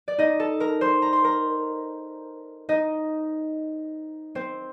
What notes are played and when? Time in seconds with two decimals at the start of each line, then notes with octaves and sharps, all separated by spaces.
0.08 D5
0.18 D#4 D#5
0.39 A4 A5
0.60 A#4 A#5
0.81 C5 C6
1.02 A#5
1.13 C6
1.24 A#4 A#5
2.69 D#4 D#5
4.35 C4 C5